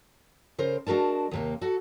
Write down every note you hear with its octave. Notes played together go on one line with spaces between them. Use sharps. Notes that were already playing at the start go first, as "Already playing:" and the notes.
C#3 A#4 C5
G#3 D4 F#4 A#4 A5
D#2 C3 A#3
F#4 A4